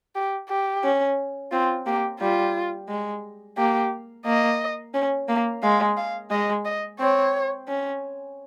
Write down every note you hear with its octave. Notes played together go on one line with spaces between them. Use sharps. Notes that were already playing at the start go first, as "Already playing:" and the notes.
G4
G4
C#4
C4 F4
A#3 G4
G3 F4
G#3
A#3 G4
A#3 D#5
C#4
A#3
G#3 F5
F5
G#3 D#5
D#5
C4 C#5
C#4